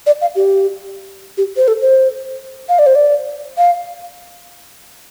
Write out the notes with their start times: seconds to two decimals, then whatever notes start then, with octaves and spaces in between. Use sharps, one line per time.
0.06 D5
0.21 F5
0.36 G4
1.38 G4
1.57 C5
1.68 A4
1.81 C5
2.69 F5
2.79 D5
2.86 C5
2.95 D5
3.58 F5